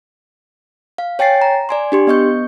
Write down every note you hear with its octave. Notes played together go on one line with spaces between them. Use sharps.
F5
C#5 G5 G#5 A6 C7
A#5
D5 G#5 C6
D4 G4 C6
B3 D#5 C#6 G6